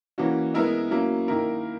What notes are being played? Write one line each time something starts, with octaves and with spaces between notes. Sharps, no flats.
E3 A#3 C#4 F#4
G#3 B3 E4 A#4 E5
F#3 A#3 C#4 E4
D#3 A#3 E4 A#4